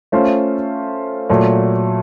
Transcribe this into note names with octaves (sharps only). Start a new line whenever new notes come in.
A3 C#4 F4 C5
A#2 F#3 A3